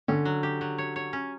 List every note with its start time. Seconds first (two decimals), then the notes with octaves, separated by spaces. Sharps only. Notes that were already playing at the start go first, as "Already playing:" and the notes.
0.08 D3 C#4
0.25 F#3
0.43 G4
0.61 F#3
0.78 C#5
0.96 C#5
1.13 C#4